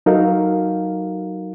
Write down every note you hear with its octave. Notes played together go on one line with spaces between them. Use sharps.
F#3 D#4 F#4 A4 A#4 F5